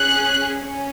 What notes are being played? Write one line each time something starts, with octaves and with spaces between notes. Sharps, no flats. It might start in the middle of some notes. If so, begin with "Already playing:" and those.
Already playing: C#4 G#4 F#6
C#4